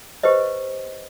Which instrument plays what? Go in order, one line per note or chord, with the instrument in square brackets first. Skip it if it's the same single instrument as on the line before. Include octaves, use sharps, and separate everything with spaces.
[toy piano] G4 B4 C5 D#5